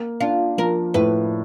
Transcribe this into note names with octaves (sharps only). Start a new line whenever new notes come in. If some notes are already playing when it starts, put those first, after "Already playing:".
Already playing: A#3
D4 F4
F3 A#4
A2 B4